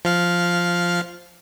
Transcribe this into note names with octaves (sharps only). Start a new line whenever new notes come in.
F3 F5 F6